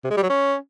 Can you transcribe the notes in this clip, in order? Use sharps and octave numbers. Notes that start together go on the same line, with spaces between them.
C3
G#3
G3
F#3
C#4